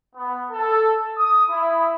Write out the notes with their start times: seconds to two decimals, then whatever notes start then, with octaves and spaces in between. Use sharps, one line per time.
0.16 B3
0.51 A4
1.18 D#6
1.49 E4